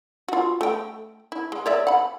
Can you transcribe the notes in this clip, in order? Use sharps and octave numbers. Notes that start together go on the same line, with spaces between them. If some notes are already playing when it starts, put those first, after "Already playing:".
F4 F#4
A3 G5
E4
G#3
C#5 D5 E5
F#5 B5